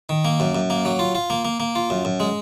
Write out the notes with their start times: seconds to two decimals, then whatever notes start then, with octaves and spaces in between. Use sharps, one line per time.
0.09 D#3
0.25 A#3
0.40 F#2
0.55 F#2
0.70 A#3
0.85 F#3
0.99 F4
1.15 F4
1.30 A#3
1.45 A#3
1.60 A#3
1.75 F4
1.90 F#2
2.05 F#2
2.20 G#3